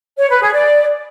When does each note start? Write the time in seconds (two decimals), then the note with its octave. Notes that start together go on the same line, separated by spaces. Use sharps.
0.18 C#5
0.30 B4
0.42 G#4
0.54 D5